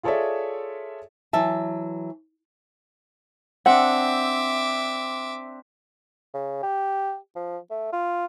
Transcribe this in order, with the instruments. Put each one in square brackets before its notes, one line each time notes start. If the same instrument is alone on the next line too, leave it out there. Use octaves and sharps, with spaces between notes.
[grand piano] F4 G#4 A4 C#5 D5 E5
[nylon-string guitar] E3 F#3 E5 A5
[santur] C4 D4 [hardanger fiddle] E5 D6 [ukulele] F#5
[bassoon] C#3
G4
F3
A3
F4